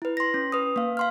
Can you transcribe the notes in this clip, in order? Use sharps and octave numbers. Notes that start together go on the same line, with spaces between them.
E4 B4
C6 A#6
C#4
B4 D#6
A#3 F5
F5 C6 F6